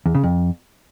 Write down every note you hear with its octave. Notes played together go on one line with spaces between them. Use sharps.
E2
C#3
F2